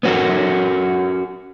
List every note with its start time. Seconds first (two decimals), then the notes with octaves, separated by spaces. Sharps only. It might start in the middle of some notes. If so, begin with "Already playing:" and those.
0.03 B3 C#4 F#4 A4 A#4